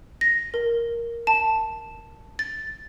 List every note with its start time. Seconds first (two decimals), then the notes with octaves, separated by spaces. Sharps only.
0.21 A#6
0.54 A#4
1.27 A5
2.39 A6